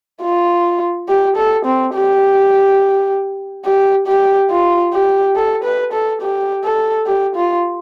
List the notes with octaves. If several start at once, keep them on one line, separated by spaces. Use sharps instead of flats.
F4
G4
A4
C4
G4
G4
G4
F4
G4
A4
B4
A4
G4
A4
G4
F4